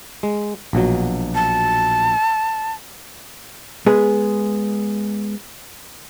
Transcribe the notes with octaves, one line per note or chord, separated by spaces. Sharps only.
G#3
A#1 B2 F#3
A5
G#3 B3 G#4